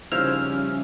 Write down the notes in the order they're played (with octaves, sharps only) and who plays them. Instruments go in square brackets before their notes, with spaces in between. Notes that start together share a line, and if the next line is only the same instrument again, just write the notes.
[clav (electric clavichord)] C#3 F3 [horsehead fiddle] G3 C#4 [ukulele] D#4 E4 C5 [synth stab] F6